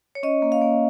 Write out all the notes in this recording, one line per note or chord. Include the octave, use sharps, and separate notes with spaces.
C#5
C#4 D#5
A#3
F5
A#3